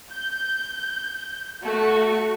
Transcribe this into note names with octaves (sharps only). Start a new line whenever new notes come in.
G6
A3 F#4 C#6